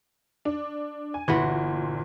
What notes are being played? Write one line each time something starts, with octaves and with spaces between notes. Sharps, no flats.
D4
G#5
G1 A#2 E3 F#4 B4 C6